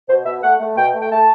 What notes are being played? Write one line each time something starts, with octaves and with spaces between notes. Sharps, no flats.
B2 C5
B2 E5
A3 F#5
A3
B2 G5
A3
G5
A3 A5